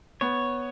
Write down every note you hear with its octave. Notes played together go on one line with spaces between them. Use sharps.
B3 C#5